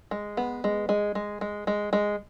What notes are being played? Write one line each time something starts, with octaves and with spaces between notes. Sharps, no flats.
G#3
B3
G#3
G#3
G#3
G#3
G#3
G#3